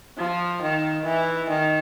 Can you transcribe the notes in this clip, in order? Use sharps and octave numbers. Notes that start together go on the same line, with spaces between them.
F3
D#3
E3
D#3